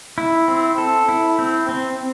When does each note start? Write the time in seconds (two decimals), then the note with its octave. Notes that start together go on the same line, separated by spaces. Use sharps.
0.18 E4
0.48 C4
0.78 A4
1.09 E4
1.39 C4
1.69 C4